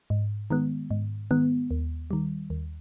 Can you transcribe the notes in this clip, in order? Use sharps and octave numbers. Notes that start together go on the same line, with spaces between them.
G#2
D#3 G#3 B3
G#2
D#3 G#3 B3
D#2
D#3 G3
D#2